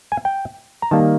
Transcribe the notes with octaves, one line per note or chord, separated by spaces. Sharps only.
G#5
G5
A#5
D#3 G3 A#3 A5